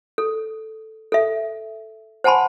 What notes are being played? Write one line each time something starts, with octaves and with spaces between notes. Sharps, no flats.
A4
A4 E5
C5 F#5 G#5 A5 B5 C6